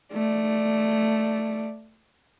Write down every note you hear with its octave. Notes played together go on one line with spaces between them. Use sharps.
A3 D5